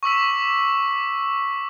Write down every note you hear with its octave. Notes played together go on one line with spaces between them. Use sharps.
C#6 D6 E6 B6